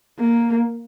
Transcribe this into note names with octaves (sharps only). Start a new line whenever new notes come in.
A#3